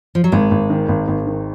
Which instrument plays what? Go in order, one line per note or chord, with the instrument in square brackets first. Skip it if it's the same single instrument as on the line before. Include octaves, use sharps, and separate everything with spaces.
[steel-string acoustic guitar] F3
F#3
[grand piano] G#1 [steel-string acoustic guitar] G#3
[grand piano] G#1
D#3
G#1
G#1
D#3